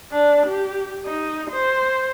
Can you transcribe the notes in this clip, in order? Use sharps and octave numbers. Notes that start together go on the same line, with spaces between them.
D4
G4
D#4
C5